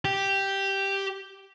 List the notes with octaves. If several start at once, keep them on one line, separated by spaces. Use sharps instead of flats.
G4